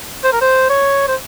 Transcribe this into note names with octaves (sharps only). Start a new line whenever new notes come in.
C5
A#4
C5
C#5
C5